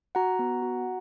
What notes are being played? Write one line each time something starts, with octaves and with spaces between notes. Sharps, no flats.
F#4 F#5 A#5
B3
F#4